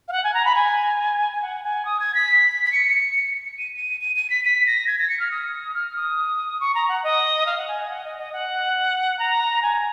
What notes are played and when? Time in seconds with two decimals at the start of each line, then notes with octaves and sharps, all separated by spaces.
0.08 F5
0.12 F#5
0.24 G#5
0.34 A#5
0.45 B5
0.55 G#5
1.32 G#5
1.42 F#5
1.64 G#5
1.85 D#6
2.00 G#6
2.15 B6
2.65 B6
2.72 C#7
3.58 D#7
3.76 D#7
4.01 D#7
4.16 D#7
4.30 B6
4.45 B6
4.67 A#6
4.87 G#6
4.99 A#6
5.09 C#7
5.20 F6
5.31 D#6
5.74 F6
5.96 D#6
6.60 C#6
6.75 A#5
6.89 F#5
7.04 D#5
7.46 F5
7.58 F#5
7.68 G#5
7.90 F#5
8.05 D#5
8.19 D#5
8.33 F#5
9.19 A#5
9.63 G#5